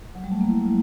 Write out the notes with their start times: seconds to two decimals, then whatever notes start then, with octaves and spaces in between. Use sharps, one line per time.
0.15 F#3
0.24 G3
0.32 A3
0.41 A#3
0.49 E4